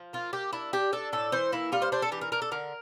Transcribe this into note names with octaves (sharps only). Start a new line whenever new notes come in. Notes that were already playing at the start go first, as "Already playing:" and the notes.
Already playing: F3
A#3 F4
A#3 G4
D4 E4
D4 G4
D4 A4
A2 A4
E3 C5
A#3 E4
G3 F4
C5
D4 C5
A4
E3 G4
A#4
D4 A#4
A4
D3 A#4